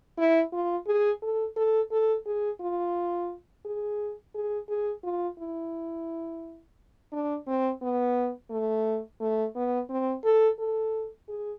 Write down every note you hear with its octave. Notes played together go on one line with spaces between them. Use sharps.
E4
F4
G#4
A4
A4
A4
G#4
F4
G#4
G#4
G#4
F4
E4
D4
C4
B3
A3
A3
B3
C4
A4
A4
G#4